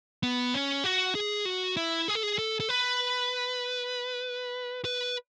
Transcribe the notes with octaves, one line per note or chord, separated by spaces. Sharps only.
B3
C#4
F#4
G#4
F#4
E4
G#4
A4
G#4
A4
A4
B4
B4